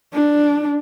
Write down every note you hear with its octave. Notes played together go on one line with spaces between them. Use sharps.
D4